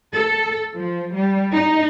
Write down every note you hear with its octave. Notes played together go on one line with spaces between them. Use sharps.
A4
F3
G3
D#4